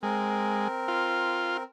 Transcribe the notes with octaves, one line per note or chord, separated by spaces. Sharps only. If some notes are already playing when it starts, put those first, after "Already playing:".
G#3 C4 A#4
F4